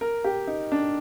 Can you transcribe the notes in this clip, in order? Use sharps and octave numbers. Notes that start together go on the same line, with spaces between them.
A#4
G4
D#4
D4